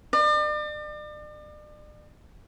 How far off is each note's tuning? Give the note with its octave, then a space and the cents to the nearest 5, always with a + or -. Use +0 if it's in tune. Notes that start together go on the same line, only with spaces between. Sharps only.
D5 +40